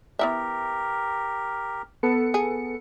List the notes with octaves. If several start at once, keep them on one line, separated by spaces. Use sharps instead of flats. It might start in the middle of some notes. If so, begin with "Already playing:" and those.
B3 E4 G4 A#4 E5
B3 A4 C#7
G#4